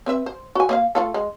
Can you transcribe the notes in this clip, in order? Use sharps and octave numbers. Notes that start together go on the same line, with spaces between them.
C4 B4 E5
C5
F#4 G#5
A#3 D#5 F5
A3 F4 A4
G#3